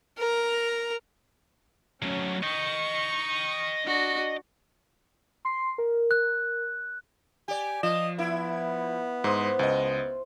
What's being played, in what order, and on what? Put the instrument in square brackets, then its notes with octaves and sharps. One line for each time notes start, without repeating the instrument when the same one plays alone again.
[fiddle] A#4 A#5
[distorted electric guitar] F#3 A3 [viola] C#4
[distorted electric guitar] D#5 G5 [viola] C#6
[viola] D4 F#4
[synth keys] C6 C7
A#4
[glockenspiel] F#6
[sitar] G4 D5 [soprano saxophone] G#5
[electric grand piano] F3 E7 [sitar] F4 [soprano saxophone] D#5
[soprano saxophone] B3 [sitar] E4
[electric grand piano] G#2 D#6 [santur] C5
[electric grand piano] C#2 D#5